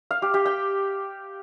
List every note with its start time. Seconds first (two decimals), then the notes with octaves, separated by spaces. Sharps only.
0.11 F5
0.22 G4
0.34 G4
0.46 G5